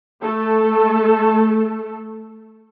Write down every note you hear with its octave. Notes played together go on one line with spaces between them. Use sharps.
A3 A4